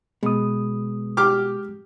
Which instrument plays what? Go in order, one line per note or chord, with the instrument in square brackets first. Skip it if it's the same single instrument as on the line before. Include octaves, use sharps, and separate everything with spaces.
[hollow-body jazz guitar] B2 [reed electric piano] G#3 D#6
[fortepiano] G4 D6 F6